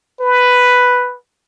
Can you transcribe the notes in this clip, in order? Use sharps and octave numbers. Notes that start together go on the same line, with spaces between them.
B4